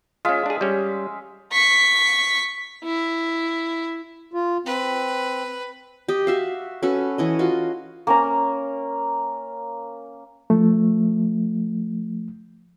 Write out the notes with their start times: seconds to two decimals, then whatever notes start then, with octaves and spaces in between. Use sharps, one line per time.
0.25 G#3 C#4 F4 E5 F5
0.46 D4 G#4
0.61 G3 C#4
1.52 C#6 B6
2.84 E4
4.33 F4
4.66 C4 B4
6.08 G4 D#5
6.27 F#4 E5 F5
6.83 C#4 F#4 A4 B4
7.18 E3 C#5 D#5
7.39 F4 F#4 D#5
8.07 A#3 C#4 A#5
10.50 F3 A3